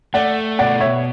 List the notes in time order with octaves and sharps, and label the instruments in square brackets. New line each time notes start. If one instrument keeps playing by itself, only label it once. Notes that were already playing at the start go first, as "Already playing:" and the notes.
[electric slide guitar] A3 [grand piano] D5 F#5
[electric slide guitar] B2 [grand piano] D5 F#5
[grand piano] C#5 E5